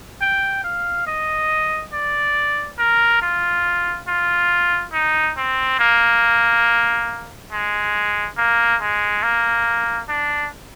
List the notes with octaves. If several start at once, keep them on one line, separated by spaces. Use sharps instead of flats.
G5
F5
D#5
D5
A#4
F4
F4
D#4
C4
A#3
G#3
A#3
G#3
A#3
D4